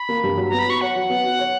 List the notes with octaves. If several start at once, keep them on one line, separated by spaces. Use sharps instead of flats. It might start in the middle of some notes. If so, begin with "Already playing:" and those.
Already playing: B5
A#3
G2
F#3
B3 A#5
B5
F#4 C#6
C#5 F#5
F#3
B3
F#4
C#5